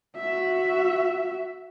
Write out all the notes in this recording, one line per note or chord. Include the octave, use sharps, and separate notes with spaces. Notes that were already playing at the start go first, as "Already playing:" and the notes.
F#4 E5